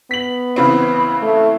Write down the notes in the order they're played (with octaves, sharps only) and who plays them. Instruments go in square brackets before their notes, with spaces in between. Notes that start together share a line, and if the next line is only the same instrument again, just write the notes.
[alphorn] B3 [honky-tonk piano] B6 F#7
[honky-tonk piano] C#3 E3 C4 [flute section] B5
[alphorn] A3